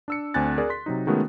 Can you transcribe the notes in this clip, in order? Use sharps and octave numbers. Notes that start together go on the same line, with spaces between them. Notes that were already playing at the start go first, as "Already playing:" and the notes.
D4 E6 C#7
D2 C4 D4 G#5 F#6 A6
G#4 A#4 D5
C6 B6
C3 F#3 D#4
D#3 G#3 A3 B3 C#4 F#4